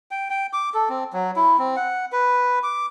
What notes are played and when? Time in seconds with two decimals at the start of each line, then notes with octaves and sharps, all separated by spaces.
0.11 G5
0.30 G5
0.53 D6
0.74 A4
0.89 C4
1.13 F#3
1.36 E4
1.58 C4
1.77 F#5
2.12 B4
2.63 D6